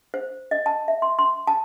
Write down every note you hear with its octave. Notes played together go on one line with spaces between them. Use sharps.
C5
D#5
A5
E5
C6
C6
A5